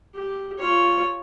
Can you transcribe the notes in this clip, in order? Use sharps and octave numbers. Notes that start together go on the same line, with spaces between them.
G4
F4 C#5